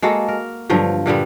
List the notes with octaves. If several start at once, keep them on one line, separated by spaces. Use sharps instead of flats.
G#3 A#3 F#4 A4
A#4
G2 D3 F3 F#3
A#2 D3 G3 B3